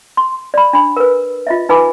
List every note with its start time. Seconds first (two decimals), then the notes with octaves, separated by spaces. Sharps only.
0.17 C6
0.54 D5 B5
0.73 D4 B5
0.96 A#4 B4
1.47 F4 D#5 E5
1.69 D#4 B4 G#5 B5 D6